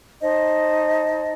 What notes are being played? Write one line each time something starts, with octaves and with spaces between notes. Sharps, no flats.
D#4 C5 D#5 A5